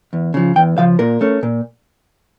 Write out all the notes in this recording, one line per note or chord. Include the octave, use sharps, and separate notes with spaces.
E2
C#3 F3
E2 G5
C#3 F3 F5
A#2 A#4
A3 C#4
A#2